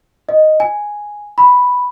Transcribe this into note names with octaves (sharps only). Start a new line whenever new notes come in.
D#5
G#5
B5